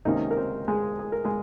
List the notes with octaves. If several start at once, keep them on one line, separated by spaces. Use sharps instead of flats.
C#2 C3 D#3 A#3 C#4 D#4 D#5
A#4
C4 C5
G#3 G#4
G#4
A#4
G#3 G#4